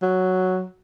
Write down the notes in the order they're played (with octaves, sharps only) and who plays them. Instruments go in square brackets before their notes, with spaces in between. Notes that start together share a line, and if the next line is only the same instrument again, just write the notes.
[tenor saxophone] F#3